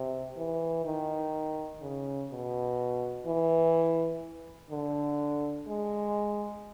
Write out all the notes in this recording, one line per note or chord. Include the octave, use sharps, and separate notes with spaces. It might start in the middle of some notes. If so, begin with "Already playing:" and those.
Already playing: C3
E3
D#3
C#3
B2
E3
D3
G#3